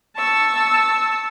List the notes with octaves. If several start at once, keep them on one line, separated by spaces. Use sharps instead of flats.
A5 C#6 E6